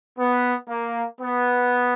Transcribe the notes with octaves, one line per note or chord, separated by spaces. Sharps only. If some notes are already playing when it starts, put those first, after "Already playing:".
B3
A#3
B3